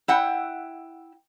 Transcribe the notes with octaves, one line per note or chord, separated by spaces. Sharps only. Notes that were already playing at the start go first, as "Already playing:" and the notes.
E4 F#5 G5